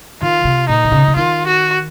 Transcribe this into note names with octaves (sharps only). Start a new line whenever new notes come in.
D#3 F4
C3
A#2 D#4
D#3
C#3
C#3
D#3 F4
F#4